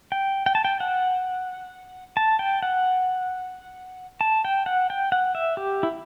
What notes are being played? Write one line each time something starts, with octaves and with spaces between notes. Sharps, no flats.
G5
G5
A5
G5
F#5
A5
G5
F#5
A5
G5
F#5
G5
F#5
E5
G4
E4